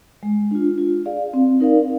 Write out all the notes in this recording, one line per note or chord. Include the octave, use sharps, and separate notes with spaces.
G#3
D4 F4
F4
G#4 D5 F5
C4
D#4 A#4 D5 F5